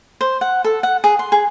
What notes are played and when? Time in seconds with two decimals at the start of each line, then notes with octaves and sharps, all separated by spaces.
0.21 C5
0.41 F#5
0.64 A4
0.83 F#5
1.04 G#4
1.19 C6
1.32 G#4